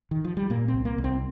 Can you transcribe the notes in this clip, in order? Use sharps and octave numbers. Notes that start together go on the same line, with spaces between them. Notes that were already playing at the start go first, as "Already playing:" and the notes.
D#3
F3
G3
A#2 A#3
C4
C2
A#3
C2
C4